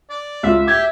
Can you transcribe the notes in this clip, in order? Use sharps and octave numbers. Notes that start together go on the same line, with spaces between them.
D5
C#2 F4 E5
G4 D6 G#6